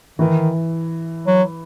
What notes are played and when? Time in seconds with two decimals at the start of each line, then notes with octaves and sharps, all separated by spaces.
0.19 D#3 E3
1.27 F#3